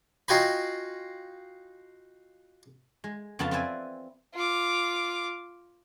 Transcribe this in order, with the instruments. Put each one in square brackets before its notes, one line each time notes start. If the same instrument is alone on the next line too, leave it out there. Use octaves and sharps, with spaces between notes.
[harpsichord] D#4 F4 F#4 G5 G#5 B5
[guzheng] G#3
F2 C#3 B3 F4 F5 A5
C4 F4 B4 D5 E5 G#5
[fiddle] F4 D6